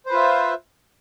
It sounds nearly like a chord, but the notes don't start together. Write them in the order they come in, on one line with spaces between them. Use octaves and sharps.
C5 B4 F4 E5